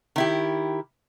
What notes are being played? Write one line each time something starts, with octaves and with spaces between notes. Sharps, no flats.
D#3 E4 G4